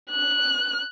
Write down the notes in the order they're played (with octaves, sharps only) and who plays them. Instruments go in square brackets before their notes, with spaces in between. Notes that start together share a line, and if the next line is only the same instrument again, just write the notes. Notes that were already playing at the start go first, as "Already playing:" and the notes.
[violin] F#6